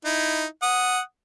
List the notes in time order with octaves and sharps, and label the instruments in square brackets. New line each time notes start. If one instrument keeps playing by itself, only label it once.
[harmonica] D#4 E4
F#5 D#6